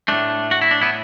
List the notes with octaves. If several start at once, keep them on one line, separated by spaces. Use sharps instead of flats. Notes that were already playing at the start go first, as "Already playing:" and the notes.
A2 A3 D4
F#4
E4
D4
B3 E4